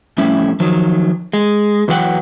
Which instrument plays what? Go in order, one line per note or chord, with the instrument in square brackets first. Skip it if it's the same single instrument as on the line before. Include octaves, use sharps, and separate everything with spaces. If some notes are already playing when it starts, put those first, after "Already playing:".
[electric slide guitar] F2 A2 G3 C#4 E4
D#3 F3 F#3
G#3
E2 E3 F#3 B4 F#5 G5